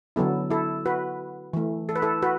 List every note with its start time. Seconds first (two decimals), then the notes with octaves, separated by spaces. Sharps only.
0.16 D3 F#3 B3 E4 A4
0.50 E4 A4
0.86 F#4 B4
1.53 E3 A3
1.89 A4
1.96 B4
2.02 E4 A4
2.22 F#4 B4